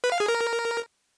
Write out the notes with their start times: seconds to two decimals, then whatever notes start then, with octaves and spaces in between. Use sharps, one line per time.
0.04 B4
0.12 F5
0.20 G#4
0.28 A#4